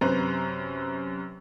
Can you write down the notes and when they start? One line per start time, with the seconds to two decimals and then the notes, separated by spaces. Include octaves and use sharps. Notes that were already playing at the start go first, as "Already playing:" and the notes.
0.01 F#2 C3 B4 C5 A#5